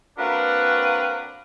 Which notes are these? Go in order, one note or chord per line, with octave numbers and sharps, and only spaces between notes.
A#3 C4 D4 F#4 A#4 B4